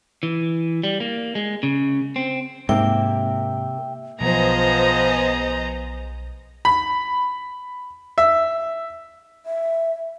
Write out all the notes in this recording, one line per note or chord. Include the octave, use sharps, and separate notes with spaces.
E3
G3
A#3
G#3
C#3
C4
G#2 C3 A#3 E5 G5
B1 F3 B3 G#4 C5 D#5 A#5
B5
E5
E5